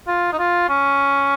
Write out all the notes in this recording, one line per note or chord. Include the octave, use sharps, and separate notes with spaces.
F4
D#4
F4
C#4